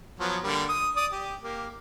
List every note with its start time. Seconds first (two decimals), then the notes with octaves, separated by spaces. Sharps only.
0.20 F3 F#3 B3
0.43 D3 G3 A#3
0.69 D#6
0.96 D5 D#6
1.12 G4
1.42 A#3 G4